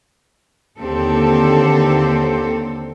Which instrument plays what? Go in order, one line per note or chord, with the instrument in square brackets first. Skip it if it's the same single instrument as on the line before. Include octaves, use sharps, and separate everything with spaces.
[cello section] D#2 D3 C4 G4 A4